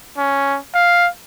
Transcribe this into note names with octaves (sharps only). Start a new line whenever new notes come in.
C#4
F5